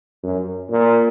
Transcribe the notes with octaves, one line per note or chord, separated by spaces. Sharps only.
F#2
A#2